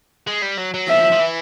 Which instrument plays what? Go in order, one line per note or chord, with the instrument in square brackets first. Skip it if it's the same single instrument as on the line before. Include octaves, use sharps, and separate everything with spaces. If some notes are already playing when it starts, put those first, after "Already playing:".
[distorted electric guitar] G#3
G3
F#3
F#3
[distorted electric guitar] F3 [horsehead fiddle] E5
[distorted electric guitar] F3
E3